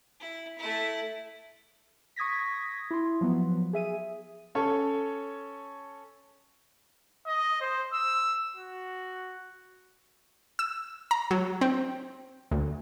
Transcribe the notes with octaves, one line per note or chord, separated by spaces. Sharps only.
E4
A3 E4
C#6 D#6 G#6 A#6 B6
E4 C6
F3 F#3 B3
G#4 E5 D#7
C#4 A4 C#5
D#5
C5
E6
F#4
E6
A#5
F#3
C4
D2